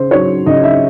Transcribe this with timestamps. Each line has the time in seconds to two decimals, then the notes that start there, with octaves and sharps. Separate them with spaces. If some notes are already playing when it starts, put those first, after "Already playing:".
Already playing: C#3 C5
0.11 F#3 C#5
0.46 C#3 D#5
0.64 E5